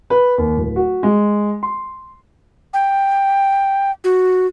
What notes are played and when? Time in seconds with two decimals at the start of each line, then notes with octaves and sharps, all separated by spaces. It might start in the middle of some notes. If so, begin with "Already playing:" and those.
0.10 B4
0.38 D#2
0.57 D1
0.76 F#4
1.03 G#3
1.63 C6
2.74 G5
4.04 F#4